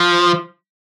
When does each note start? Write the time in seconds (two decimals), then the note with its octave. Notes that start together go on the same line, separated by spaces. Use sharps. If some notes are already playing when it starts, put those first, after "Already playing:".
Already playing: F3